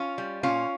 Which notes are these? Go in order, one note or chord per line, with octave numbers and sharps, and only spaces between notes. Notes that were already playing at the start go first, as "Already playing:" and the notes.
Already playing: C#4 F4
G3
A#2 C#4 F4